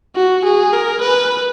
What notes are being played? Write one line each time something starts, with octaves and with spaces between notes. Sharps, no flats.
F#4
G#4
A#4
B4